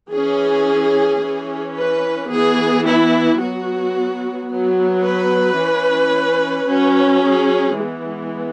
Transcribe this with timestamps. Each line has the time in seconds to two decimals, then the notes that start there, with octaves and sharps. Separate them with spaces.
0.13 E3 C#4 G#4
1.21 E3 C#4
1.77 B4
2.31 E3 B3 G#4
2.86 E4
3.40 F#3 B3 F#4
4.50 F#3 B3
5.04 B4
5.59 E3 C#4
6.68 F#3 C#4
7.22 G#4
7.77 E3 G#3 B3